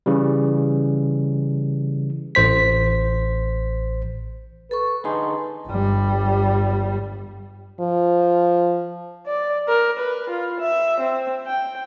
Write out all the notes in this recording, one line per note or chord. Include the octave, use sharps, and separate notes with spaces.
C#3 E3 G3
A1 C5 B6
A4 B4 C#6
D3 D#4 G#4 C6
G1 G3
F3
D5
A#4
B4
F4
E5
C4
G5